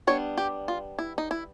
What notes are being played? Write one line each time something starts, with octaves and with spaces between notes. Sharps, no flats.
G3 B3 D4 C#5
G4
F4
E4
D#4
E4